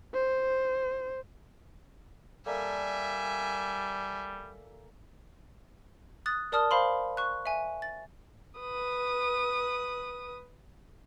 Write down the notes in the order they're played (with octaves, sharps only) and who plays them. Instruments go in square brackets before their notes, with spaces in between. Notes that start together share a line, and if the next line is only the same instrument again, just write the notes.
[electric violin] C5
[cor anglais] G3 [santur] A#3 A4 D5 [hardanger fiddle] E5 G#5
[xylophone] D#6 F#6 A6
A#4 D5 A5 D#6 F6
C5 F5 B5 C6
C#6 F#6
E5 G#5
A6
[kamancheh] B4 D#6